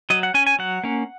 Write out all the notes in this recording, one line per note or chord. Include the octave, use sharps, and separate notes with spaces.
F#3 D#5
F#5
C#4 G#5
G#5
F#3 F#5
A#3 C#4